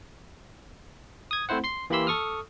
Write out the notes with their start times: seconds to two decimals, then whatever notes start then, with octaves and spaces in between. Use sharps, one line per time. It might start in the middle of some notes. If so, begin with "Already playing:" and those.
1.31 D#6 G#6
1.49 A3 C4 E4 C5 F#5
1.64 C6 C7
1.90 E3 A#3 G4 B5 C6 E6
2.07 A4 C#6 D#6 F6